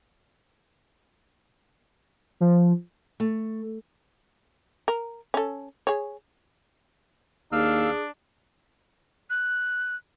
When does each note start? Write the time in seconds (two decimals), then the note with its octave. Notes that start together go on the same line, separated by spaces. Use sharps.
2.41 F3
3.20 A3
4.88 A#4
5.34 C#4 A4
5.87 G#4 C#5
7.52 D#2 D4 G#4 F5 E6 F6
9.30 F#6